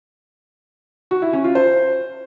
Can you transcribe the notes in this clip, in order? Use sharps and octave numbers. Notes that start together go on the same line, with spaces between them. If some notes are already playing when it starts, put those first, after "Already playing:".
F#4
E4
C#4
F4
C5